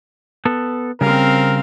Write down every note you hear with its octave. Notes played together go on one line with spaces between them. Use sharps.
B3 A4
C#3 G3 C4 A#4 F5